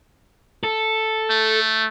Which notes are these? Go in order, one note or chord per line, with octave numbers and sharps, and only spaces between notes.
A4
A3